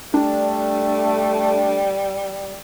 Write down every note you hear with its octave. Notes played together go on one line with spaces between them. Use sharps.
G3 A3 D4